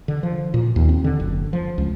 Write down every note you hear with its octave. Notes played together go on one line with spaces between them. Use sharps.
D3
F3
A#2
D#2
C4
D3
F#1
F3
C#2